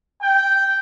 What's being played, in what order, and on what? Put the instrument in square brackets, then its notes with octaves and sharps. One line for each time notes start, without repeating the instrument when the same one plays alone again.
[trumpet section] G5